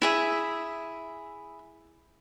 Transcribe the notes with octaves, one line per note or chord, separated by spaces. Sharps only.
E4 G#4 E5